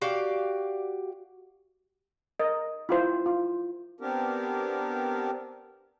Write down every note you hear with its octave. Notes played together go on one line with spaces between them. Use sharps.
F#4 G4 D5 F5
A#4 D#5
E4 F4 C5
F4
B3 C4 D4 G4 A#4